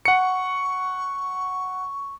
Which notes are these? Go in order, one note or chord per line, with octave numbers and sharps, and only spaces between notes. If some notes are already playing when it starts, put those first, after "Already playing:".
F#5 C#6 C#7